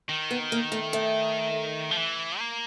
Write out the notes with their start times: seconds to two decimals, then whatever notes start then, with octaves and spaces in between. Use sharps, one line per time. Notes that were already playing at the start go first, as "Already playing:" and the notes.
0.09 D#3
0.31 B3
0.52 A#3
0.72 A3
0.93 A3
1.91 F3
1.97 E3
2.39 A#3